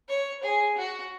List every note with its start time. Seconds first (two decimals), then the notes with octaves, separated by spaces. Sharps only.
0.09 C#5
0.43 G#4
0.77 F#4